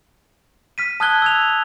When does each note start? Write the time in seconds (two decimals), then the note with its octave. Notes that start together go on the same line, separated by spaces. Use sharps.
0.78 F6 B6 D#7
1.00 A5 D#6 F6 F#6 G#6 G7
1.22 E6 G#6 F7